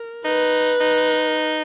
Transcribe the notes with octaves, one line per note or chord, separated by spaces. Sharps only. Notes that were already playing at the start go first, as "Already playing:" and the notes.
Already playing: A#4
D#4 B4
D#4